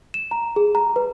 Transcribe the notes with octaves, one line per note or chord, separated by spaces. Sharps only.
E7
A#5
G#4
A#5
B4